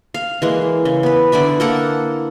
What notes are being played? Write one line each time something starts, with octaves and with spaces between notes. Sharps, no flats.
F5
E3 G#3 A#3
C#3
B3 B4
D3 E4 D5 E5
A#3 A4 F#5